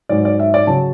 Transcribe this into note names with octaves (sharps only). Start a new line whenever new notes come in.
G#2 F#3 D5
D5
E5
D5
C#3 F#3 A5